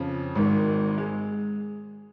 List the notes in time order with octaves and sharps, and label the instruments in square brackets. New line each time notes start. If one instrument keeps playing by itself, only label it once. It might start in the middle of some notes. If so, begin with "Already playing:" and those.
Already playing: [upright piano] F2 C#3 F3
G#1 G#2 D#3
G#3